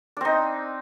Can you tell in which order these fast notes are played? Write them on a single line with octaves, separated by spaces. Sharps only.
D4 C4 D#4